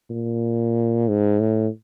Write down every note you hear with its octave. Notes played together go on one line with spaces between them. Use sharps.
A#2
G#2
A2